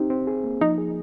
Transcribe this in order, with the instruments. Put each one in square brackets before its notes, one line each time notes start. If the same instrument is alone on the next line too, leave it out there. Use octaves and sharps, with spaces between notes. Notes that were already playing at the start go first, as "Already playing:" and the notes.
Already playing: [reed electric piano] C4 G4 [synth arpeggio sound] D#4
[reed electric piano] C4
G#4
A#3
[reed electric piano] F3 [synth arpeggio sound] D#4
[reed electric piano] G#4